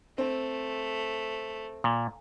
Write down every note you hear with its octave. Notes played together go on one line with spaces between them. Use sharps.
A3 C4
A#2